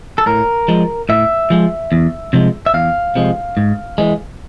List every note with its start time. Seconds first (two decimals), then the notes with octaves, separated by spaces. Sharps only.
0.18 A4
0.26 A2 A#4
0.68 F3 G#3
1.09 A2 E5
1.50 F3 G#3
1.92 E2
2.33 C3 F3 G#3
2.66 E5
2.74 E2 F5
3.15 C3 F3 G#3
3.57 G#2
3.98 E3 G#3